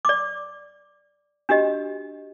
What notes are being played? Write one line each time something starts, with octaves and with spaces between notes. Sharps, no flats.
D5 D6
D4 F#4 G4 D#5